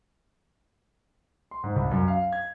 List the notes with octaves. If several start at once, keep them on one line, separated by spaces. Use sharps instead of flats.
C6
G#2
C2
F#2
F5
G#6